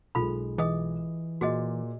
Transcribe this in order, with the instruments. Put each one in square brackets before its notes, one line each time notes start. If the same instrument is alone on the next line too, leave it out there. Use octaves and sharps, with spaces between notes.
[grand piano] B1 G#3 [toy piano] F4 A4 B5
[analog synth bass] E3 [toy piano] G#4 D#5 D#6
[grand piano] A#2 [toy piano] F#4 G#4 D#5